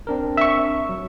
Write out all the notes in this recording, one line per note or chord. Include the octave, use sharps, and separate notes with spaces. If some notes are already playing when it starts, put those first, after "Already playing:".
C4 D4 A#4
E5 C#6
F#3